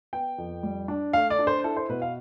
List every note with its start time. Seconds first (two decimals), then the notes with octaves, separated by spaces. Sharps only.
0.13 B3 G5
0.38 F2
0.63 G3
0.88 D4
1.13 A3 F5
1.30 D5
1.39 D4
1.47 C5
1.64 E4 A4
1.77 C5
1.89 B2 B4
2.02 F5